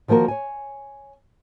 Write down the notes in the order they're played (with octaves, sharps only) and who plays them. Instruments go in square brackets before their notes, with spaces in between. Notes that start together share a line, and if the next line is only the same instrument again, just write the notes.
[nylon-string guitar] D#3 F3 A#3 F#4 A#4
C#5 G#5